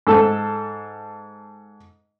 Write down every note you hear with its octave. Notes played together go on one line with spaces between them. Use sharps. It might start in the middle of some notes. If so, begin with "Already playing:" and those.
G#2 A4 A5